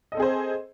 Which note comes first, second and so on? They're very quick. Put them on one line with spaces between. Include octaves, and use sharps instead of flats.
D#5 A4 C4 G#4 C5